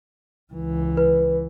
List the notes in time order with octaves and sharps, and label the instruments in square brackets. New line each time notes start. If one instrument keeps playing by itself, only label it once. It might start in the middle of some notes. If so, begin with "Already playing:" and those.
[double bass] C#2 E3
[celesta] B4